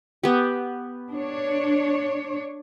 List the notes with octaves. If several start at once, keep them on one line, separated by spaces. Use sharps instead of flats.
B3 G4
D4 C#5